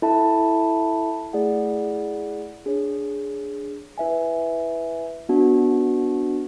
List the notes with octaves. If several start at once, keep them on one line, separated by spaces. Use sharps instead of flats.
E4 A4 E5 A5
A3 E4 G#4 D5 F#5
D4 G#4 C#5
E4 B4 E5 G#5
B3 D4 F#4